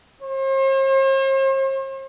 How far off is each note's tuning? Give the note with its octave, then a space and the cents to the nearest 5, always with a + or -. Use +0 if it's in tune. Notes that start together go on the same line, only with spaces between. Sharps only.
C5 +45